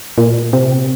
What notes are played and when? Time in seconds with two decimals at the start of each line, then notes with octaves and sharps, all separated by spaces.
0.18 A#2
0.53 C3